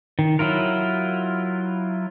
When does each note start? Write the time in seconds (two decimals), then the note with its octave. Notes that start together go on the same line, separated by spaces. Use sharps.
0.19 D#3
0.39 F#3 E4 F4 A#4